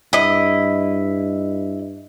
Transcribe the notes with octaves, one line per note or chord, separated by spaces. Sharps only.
G2 E4 D#5